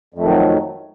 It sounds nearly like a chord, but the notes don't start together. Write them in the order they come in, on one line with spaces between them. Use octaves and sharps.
F2 A3 D#3 F#3